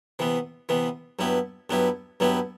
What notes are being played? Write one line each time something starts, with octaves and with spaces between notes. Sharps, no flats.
C3 E3 B3
C3 E3 B3
G2 F#3 B3 E4 G4
G2 F#3 B3 E4 G4
G2 F#3 B3 E4 G4